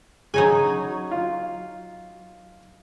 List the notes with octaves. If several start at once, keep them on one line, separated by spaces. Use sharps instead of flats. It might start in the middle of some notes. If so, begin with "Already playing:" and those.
C#3 F#3 D#4 G#5
F4